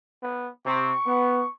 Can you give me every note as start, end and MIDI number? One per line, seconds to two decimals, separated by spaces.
0.23 0.49 59
0.66 0.92 48
0.66 0.92 60
0.66 1.51 85
1.06 1.42 59